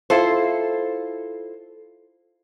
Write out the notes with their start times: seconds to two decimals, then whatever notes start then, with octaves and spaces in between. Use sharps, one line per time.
0.10 E4 F4 A4 C5